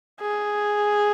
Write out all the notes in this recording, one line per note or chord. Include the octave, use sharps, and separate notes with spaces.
G#4